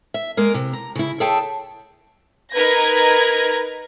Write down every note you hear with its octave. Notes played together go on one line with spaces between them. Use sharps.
E5
G#3 A#3 A#4
C3
A#5
C#3 E4
G#4 A4 C#5 E5 G5 A5
D#4 A#4 B4 G#6 A#6